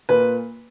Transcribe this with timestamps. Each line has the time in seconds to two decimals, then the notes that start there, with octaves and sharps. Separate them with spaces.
0.09 A#2 B4